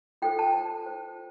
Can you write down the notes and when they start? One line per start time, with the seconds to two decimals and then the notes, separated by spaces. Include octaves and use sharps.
0.22 F4 A4 C5 G5
0.39 A5
0.54 F4 C5
0.86 F4 C5